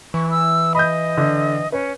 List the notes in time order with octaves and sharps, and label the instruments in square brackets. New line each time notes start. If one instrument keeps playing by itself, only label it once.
[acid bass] E3 [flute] C#6
[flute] E6
[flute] D#5 [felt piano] B5 G6
[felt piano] D3
[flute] C#4 [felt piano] B4